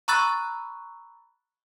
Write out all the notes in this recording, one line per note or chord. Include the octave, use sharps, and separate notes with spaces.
A#5 B5 C#6 E6 F#6 A6